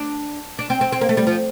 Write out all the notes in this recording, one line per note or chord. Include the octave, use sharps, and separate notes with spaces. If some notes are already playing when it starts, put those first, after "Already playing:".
Already playing: D4
D4
C4
C4
C4
A#3
A3
G3
F3